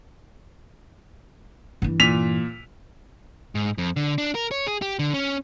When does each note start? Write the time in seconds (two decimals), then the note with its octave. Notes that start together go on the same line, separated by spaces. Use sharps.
1.82 G2 E3
2.00 A#2 B6 F7
3.55 G#2
3.78 F2
3.96 D3
4.18 D4
4.35 A#4
4.51 C#5
4.67 G#4
4.82 G4
4.99 D3
5.14 C#4